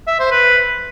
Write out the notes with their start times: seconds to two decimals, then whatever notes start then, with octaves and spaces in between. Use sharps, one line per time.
0.08 E5
0.19 C5
0.31 B4